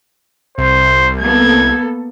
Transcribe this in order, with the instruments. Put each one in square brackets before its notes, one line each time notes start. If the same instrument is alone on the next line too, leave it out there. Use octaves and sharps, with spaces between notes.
[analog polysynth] C2 [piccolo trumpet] C5
[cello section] A#3 B3 A4 [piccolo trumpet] G#6